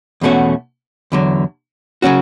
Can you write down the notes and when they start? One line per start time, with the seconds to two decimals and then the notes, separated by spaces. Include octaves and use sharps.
0.21 E2 B2 A3 C#4 F#4
1.12 E2 D3 F#3
2.02 C#3 F#3 C#4 F#4